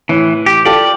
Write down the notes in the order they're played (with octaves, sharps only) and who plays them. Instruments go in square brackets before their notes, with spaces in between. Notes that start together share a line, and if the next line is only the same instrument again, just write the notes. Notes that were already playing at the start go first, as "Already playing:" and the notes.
[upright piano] A2 [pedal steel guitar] E3
[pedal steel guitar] G4
[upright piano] F4 G4 A4 [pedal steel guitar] D5